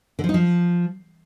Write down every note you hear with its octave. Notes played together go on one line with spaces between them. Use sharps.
D3
F3
D#4
F3